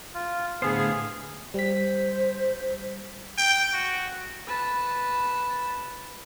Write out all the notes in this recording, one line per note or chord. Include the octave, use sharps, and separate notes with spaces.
F4
A2 D3 B3 G#4 C5 F5
G3 C5 B6
G5
F#4
B4 A5